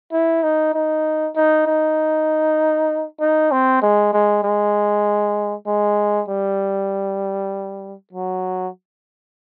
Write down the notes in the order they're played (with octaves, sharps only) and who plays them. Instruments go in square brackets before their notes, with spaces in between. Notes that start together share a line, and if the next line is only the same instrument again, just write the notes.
[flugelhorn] E4
D#4
D#4
D#4
D#4
D#4
C4
G#3
G#3
G#3
G#3
G3
F#3